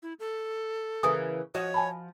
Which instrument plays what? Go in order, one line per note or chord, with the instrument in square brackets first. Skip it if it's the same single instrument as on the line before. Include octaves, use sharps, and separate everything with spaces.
[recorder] E4
A4
[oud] C#3 E3 A#3 [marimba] G#5 D#6
[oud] F3 F#4 D#5 [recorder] C#5
[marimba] G#5 A5 B5